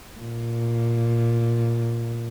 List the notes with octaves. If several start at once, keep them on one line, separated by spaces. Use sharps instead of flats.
A#2